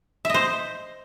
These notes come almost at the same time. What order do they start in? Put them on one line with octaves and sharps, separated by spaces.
E5 D#5 C5